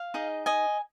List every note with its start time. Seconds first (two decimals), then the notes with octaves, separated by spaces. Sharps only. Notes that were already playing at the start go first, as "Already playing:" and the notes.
Already playing: F5
0.14 D#4 G#4 D#5
0.46 D#5 G#5